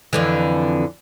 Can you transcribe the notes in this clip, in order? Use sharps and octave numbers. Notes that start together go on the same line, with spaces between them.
F2 D3 E3